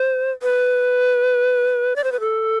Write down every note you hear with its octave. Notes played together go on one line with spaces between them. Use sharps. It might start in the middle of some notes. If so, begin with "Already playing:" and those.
Already playing: C5
B4
D5
C5
B4
A4